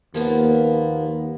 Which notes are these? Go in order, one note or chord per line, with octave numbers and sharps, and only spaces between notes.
D#2 F3 A#3 B3